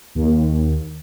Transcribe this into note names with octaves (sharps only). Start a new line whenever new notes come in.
D#2